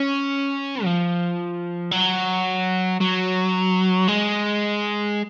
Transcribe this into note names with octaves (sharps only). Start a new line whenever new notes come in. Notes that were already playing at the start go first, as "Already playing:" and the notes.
Already playing: C#4
F3
F#3
F#3
G#3